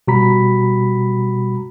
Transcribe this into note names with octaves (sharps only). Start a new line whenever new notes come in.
B2 G3 F#4 A#5 B5 B6